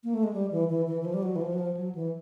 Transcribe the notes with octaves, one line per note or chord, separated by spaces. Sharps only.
A#3
A3
G#3
G3
E3
E3
E3
E3
F3
G3
F#3
E3
F3
F#3
F3
F#3
E3